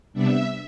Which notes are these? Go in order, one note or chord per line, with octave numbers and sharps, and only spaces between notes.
C3 G3 B3 D4 E5